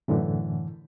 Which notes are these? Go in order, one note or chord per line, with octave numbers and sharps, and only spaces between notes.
F#2 A2 D3 E3